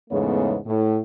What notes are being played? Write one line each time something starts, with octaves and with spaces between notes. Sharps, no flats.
E2 G#2 C#3 A3 B3 C#5
A2